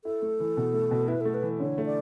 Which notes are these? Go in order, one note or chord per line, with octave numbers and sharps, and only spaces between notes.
E4 A4
A3
E3
B2
A3
B2
E4 B4
A3 A4
B4
E3
D3 C#5
A3
D5